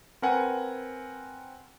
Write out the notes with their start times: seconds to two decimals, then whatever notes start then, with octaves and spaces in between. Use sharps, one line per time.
0.22 C4 A#4 B4 F#5 G#5